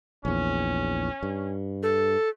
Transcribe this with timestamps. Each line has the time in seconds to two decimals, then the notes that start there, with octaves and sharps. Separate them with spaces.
0.25 A#1 E2 C#4
1.23 G2
1.83 A4